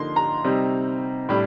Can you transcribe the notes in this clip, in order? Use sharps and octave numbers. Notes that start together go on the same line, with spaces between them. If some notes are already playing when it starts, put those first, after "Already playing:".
Already playing: D3 F3 A#3 D#4 C6
A#5
C3 G3 C4 D#4
A2 G3 D4